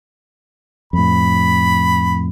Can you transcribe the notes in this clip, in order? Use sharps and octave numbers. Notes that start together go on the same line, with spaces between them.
F2 A2 B5